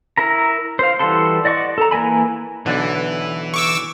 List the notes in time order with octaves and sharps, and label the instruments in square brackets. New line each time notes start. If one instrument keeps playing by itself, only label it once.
[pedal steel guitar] E4 A#4 A#5
C5 F5
E3 G3 F#4 A4 C6
D5 D#5 F#5 C#6 D6
A4 A#5
E3 A#3 A#4 G#5 B5
[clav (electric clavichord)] B1 D3 D4 [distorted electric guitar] E3
[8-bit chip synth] C#6 D6 E6